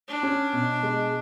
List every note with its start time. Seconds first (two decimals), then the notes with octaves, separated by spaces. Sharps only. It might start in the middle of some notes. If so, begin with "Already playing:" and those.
0.09 D4
0.23 C#4
0.53 B2
0.83 G#3